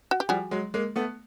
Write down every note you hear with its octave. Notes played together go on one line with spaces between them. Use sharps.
F#4
G4
F3 G3 F#4 G#4
F#3 G#3
G#3 A#3
A3 B3